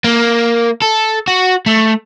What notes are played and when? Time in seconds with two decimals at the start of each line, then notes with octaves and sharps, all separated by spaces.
0.04 A#3
0.82 A4
1.28 F#4
1.66 A3